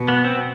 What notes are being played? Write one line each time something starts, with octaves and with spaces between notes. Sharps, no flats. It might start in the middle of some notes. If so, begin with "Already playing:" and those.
Already playing: B2
B3
C4